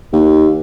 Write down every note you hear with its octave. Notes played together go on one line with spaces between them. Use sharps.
D#2